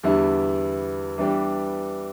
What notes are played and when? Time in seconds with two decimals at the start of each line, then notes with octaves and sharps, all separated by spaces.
0.03 E2 D3 G3 B3 E4
1.18 E3 G3 B3 D4 G4